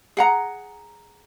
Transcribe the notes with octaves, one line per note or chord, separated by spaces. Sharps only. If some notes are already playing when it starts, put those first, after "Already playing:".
G#4 F#5 A#5